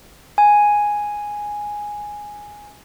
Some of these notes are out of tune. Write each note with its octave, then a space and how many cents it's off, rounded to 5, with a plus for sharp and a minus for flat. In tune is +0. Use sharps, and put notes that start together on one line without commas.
G#5 +0